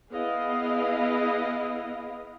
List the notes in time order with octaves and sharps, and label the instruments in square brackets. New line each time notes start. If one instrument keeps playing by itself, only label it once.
[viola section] B3 E4 G#4 D#5 F5